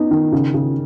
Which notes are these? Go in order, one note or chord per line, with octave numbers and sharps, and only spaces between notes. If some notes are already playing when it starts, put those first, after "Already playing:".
Already playing: B3 D#4
D#3
C#3
C#3